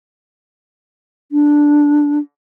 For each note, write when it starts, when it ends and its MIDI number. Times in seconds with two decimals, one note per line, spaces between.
1.32 2.18 62